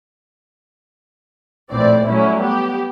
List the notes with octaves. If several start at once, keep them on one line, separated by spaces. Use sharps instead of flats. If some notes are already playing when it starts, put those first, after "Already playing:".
A#1 A2 E3 C4 D5
F#3 G3 A3 C#4 E4
B3 G4